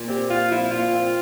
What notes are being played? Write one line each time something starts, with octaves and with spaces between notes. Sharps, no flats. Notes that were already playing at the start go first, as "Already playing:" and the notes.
Already playing: A#2
C4 G4
A#2 F4
F3 E4
A#2 F4
C4